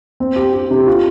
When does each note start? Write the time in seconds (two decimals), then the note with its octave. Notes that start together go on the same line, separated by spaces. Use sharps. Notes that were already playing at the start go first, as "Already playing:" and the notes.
0.20 C4
0.36 G4
0.54 G4
0.71 C3
0.87 F4